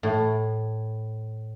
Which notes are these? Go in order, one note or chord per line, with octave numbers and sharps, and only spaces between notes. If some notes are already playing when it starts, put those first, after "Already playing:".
A2